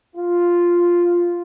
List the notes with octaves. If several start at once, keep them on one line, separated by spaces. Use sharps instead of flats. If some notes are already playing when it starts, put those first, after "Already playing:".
F4